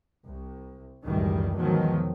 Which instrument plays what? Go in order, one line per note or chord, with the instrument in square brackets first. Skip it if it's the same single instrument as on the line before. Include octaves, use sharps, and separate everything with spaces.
[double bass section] C2
C#2 F#2 A2 D#3 E3 G3
E2 G#2 B2 D#3 F3 F#3